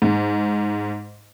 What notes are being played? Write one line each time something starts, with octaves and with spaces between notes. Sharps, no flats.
G#2